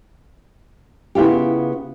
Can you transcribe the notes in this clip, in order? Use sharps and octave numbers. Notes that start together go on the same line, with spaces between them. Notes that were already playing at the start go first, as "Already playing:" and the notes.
C#3 B3 E4 F4 G4